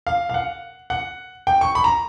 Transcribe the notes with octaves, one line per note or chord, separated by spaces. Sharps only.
F5
F5
F#5
F#5
G5
C#6
B5
A#5